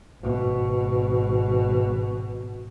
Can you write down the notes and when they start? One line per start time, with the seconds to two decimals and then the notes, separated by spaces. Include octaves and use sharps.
0.22 G#1 B2